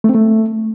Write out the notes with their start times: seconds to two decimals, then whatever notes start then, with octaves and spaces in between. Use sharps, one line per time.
0.04 A3
0.09 C4
0.14 A3